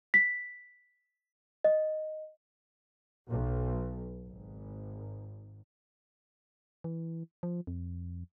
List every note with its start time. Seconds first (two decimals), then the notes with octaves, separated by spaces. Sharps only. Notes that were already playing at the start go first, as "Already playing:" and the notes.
0.14 B6
1.64 D#5
3.29 B1
4.25 G#1
6.84 E3
7.43 F3
7.67 F2